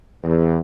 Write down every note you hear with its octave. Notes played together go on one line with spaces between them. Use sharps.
E2